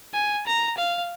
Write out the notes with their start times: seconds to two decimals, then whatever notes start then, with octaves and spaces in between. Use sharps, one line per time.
0.14 G#5
0.47 A#5
0.78 F5